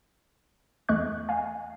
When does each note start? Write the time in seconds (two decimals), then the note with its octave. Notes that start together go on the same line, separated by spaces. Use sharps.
0.89 E2 A3 D#5 C#6 F#6
1.29 F5 G#5